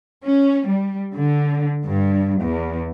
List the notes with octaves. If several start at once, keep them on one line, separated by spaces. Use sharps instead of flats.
C#4
G3
D3
G2
E2